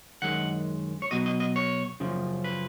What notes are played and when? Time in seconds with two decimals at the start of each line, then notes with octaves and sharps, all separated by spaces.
0.22 F#2 D#3 G#3 F#5
1.02 C#5
1.11 B2 F#3 D#5
1.26 D#5
1.40 D#5
1.56 C#5
2.00 F#2 C#3 F3
2.44 B4